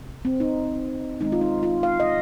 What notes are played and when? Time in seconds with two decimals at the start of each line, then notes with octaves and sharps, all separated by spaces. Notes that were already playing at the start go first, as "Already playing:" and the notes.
Already playing: C3
0.25 C4
0.40 D#4
1.20 D#3 G#3 C4 D#4
1.32 F4
1.41 D#4
1.63 F4
1.83 F5
2.00 D#5